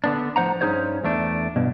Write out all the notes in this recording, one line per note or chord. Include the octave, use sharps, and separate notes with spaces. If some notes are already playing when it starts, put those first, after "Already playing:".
D3 B3 D4
A2 F3 C5 F#5 A#5
G2 C#4 D#4 G#4 C5 C#5
E2 A3 D4
G2 B2